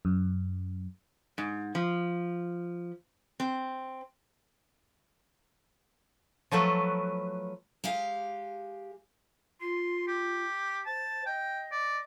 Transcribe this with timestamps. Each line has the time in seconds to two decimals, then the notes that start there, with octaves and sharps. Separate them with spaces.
0.05 F#2
1.38 G#2
1.75 F3
3.40 C4
6.51 F3 F#3 A3 B4
7.84 G#3 G4 F5
9.61 F4 C6
10.07 G4
10.86 C5 A5
11.26 D#5 G5
11.71 D5